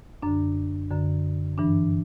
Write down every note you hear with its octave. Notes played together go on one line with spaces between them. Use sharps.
F#2 D3 D4
F#2 D3
G2 E3 D4